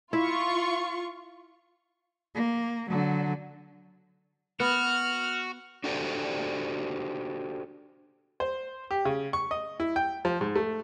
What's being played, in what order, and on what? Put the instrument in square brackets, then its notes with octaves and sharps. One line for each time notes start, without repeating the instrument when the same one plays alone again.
[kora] E4 [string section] F4 C#6
[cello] A#3
D3 F#3
[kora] B3 [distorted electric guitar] F#4 [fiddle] F6
[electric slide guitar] D4 F#4 G4 A4 C5 D5
[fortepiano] C5
G4
C#3
C#6
D#5
E4
G5
F3
G#2
A3